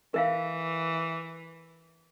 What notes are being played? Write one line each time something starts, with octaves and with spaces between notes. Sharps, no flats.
E3 A#4 E5 F5